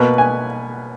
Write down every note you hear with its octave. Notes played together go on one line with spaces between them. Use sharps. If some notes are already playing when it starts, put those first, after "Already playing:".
Already playing: B2 A#3 B4
G#5